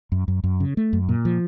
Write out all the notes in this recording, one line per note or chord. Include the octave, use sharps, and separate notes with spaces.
F#2
F#2
F#2
C#3
A3
F#2
A#2
F3